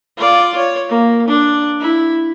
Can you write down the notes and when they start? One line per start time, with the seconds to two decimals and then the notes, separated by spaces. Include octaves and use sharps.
0.17 F4 D5
0.57 C#5
0.89 A#3
1.28 D4
1.80 E4